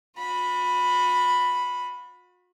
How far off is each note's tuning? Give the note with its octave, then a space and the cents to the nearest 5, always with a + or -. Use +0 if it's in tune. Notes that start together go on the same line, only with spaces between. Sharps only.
F#4 -45 B5 +0